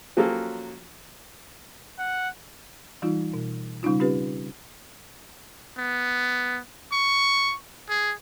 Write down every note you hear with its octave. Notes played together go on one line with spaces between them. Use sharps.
F3 F#3 A#3 C#4 G4 A4
F#5
E3 G3 D#4 F4
B2
C#3 G3 C#4 D#4 F4
C4 C#4 F4 G4 B4
B3
C#6
G#4